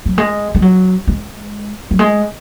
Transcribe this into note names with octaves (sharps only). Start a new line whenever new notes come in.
F#3
G#3
G#3
F#3
G#3
F#3
G#3